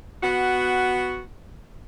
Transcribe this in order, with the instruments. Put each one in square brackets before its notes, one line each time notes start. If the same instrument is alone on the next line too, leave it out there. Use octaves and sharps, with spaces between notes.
[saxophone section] B3 F#4